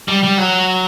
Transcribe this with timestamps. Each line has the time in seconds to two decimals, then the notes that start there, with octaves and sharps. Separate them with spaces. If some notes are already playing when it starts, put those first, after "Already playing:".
0.08 G3
0.23 G3
0.38 F#3